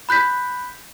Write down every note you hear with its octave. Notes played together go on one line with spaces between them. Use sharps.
B5 F#6 G6 B6